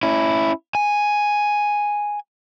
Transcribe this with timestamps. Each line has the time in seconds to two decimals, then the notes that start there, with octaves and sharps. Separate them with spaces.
0.03 C#4 E4
0.75 G#5